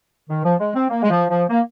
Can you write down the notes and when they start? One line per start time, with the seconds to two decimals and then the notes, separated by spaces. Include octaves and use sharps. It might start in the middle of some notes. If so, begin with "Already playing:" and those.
0.29 D#3
0.44 F3
0.60 G#3
0.74 C4
0.89 A#3
1.03 G#3
1.10 F3
1.30 F3
1.50 A#3